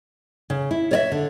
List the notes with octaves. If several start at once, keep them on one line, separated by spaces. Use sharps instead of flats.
C#3
E4
C#5 D5 E5
D3